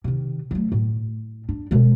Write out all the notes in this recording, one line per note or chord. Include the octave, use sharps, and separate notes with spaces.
C3 D#3
F#3 A3
A2
D4
B2 G#3